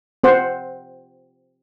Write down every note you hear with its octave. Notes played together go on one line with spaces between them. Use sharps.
C4 C5 F#5